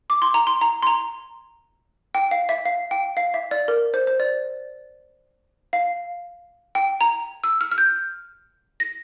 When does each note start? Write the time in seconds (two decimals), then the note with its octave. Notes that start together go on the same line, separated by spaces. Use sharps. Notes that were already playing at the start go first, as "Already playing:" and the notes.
0.10 D6
0.22 C6
0.34 A#5
0.47 C6
0.61 A#5
0.83 C6
0.87 A#5
2.15 G5
2.31 F5
2.49 E5
2.65 F5
2.91 G5
3.17 F5
3.34 E5
3.51 D5
3.68 A#4
3.94 C5
4.07 C5
4.20 D5
5.73 F5
6.75 G5
7.01 A#5
7.44 E6
7.61 F6
7.71 F6
7.78 G6
8.80 A#6